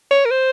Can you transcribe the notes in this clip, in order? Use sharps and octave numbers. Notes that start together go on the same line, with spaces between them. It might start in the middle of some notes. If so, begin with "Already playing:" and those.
C#5
A#4
C5